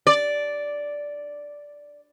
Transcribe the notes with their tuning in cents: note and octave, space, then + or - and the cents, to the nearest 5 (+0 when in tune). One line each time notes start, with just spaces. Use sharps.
D5 -5